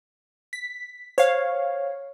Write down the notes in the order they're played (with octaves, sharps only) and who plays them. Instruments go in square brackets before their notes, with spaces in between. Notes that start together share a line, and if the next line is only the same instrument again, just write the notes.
[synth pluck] B6
[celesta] C5 [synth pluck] C#5 F5